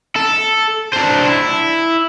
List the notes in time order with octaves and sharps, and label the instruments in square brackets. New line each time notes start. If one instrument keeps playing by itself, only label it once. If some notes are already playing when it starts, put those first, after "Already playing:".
[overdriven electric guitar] A4
D4 C5
E4